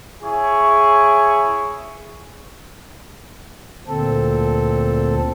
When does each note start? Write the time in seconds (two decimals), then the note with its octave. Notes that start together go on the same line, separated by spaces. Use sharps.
0.23 E4 G#4 C#5 C#6
3.87 D2 A#2 C4 A4